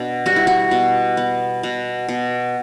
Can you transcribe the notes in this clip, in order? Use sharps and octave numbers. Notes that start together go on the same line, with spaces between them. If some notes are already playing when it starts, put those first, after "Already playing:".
Already playing: B2 D4
G3 F#4
E4
F#4
B2
B3
B2
B2